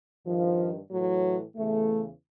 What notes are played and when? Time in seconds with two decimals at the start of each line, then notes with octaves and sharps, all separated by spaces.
0.25 G2 D#3 F3
0.91 A2 E3 F#3
1.56 E2 C#3 E3 A3